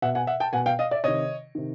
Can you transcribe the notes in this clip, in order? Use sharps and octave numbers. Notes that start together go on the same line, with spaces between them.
B2 E5 F#5
F#5 G#5
E5 F#5
G5 A5
B2 F#5 G#5
F5 G5
D#5 F5
D5 E5
C3 D#3 C#5 D#5
C3 D#3